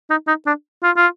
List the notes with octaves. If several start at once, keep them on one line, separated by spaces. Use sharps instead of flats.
D#4
D#4
D4
F4
F4